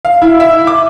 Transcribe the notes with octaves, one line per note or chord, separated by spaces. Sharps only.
F5
E4
E5
D6